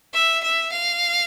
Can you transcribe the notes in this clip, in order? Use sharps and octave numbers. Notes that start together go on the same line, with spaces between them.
E5
E5
F5